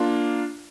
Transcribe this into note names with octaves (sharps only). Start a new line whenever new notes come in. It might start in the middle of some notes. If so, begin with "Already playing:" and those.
Already playing: A#3 D4 F4